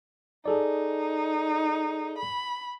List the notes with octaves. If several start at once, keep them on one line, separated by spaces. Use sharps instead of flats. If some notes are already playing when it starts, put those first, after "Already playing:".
D#4 G#4 A4 D5
B5